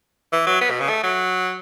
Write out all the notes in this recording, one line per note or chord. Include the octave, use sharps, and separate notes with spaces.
E3
F#3
B3
B2
C#3
A3
F#3